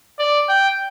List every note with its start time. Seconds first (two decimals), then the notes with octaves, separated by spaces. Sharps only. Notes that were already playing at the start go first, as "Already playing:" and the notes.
0.19 D5
0.49 G5